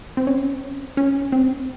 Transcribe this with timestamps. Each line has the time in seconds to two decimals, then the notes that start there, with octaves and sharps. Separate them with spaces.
0.17 C4
0.27 C#4
0.97 C#4
1.32 C4